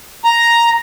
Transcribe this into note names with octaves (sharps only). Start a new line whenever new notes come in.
A#5